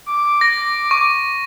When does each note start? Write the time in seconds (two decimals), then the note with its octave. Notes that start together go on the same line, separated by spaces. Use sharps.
0.06 D6
0.41 A#6
0.91 C#6